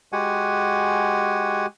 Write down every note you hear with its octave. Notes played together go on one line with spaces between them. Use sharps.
G#3 F#4 G4 F#5 G#5